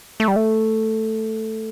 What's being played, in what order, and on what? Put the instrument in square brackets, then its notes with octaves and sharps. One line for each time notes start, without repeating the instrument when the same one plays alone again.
[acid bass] A3
G3
A3